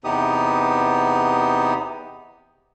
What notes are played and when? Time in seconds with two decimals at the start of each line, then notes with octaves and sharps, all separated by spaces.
0.04 E2 C3 B3 D#4 G4 D#6